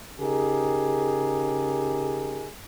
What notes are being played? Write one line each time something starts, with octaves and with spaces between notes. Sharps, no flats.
C#3 D#4 G4 G#4 A#4